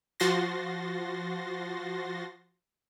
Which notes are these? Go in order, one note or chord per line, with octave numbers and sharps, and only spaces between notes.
F3 F#4 C6 A6 A#6